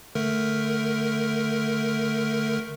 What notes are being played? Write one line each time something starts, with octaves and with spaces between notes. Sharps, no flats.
D3 A3 A#4